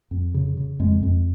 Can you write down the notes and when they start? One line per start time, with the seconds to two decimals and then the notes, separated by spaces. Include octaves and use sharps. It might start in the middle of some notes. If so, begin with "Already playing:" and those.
0.11 F2
0.34 C#3
0.57 C#3
0.80 F2 G#3
1.03 F2